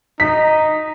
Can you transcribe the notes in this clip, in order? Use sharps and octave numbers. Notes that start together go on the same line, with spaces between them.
D#4 B6